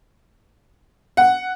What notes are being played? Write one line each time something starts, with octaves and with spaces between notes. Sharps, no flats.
F#5